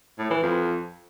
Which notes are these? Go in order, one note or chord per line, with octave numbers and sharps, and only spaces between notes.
A2
E3
F2